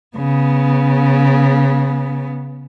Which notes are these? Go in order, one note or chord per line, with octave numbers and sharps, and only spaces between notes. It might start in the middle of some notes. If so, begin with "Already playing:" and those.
C#3 B3